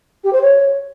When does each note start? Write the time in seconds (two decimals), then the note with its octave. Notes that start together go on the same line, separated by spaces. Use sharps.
0.24 G4
0.33 C5
0.41 C#5